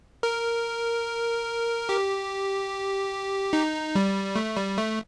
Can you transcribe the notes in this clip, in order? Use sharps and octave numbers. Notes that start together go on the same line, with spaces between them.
A#4
G4
D#4
G3
A3
G3
A3